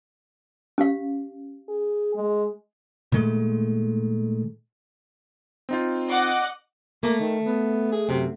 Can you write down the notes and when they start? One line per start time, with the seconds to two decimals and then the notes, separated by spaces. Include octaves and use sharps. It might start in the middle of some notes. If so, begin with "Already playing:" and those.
0.78 C#4 G4 F5
1.69 G#4
2.15 G#3
3.12 A#2 D#3 G#3 A3
5.69 C4 D#4 F4
6.09 D#5 F#5 D6
7.03 A3 A#3
7.20 D#3
7.46 B3
7.92 G#4
8.09 F#2 C3